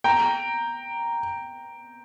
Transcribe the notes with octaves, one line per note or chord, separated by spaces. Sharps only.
G5 A#5